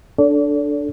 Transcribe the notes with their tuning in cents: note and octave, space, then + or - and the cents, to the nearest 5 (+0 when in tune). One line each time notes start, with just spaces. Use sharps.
D4 +0 A4 +0 D5 -40